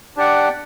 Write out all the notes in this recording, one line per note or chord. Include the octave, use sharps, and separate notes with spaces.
D4 G4 D5 F#5